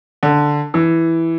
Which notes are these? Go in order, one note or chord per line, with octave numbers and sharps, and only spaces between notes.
D3
E3